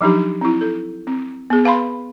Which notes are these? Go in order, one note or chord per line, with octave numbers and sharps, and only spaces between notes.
F3 F#3 D4 D#4 G4
C4 E4
A4
C4
B3 G#4
B4 F5 A5 B5 C6